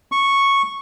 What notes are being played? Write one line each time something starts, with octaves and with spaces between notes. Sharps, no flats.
C#6